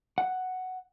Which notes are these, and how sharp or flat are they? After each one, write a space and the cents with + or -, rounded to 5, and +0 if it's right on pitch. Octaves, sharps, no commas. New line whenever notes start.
F#5 +5